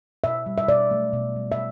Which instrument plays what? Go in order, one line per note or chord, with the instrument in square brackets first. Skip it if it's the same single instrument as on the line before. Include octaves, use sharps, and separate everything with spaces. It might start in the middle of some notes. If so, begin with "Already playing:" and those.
[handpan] B2 E5
G3
E5
B2 D5
F#3 A3
B2
G3
E5